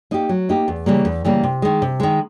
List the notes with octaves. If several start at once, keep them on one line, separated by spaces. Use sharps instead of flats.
A#3 D#4 G4
F#3
A#3 D#4 G4
E2
C#3 E3 G3 A#3
E2
C#3 E3 G3 A#3
C3
D#3 G#3
C3
D#3 G#3